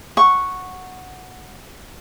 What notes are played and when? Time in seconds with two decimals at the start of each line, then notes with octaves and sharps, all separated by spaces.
0.17 F#5 C#6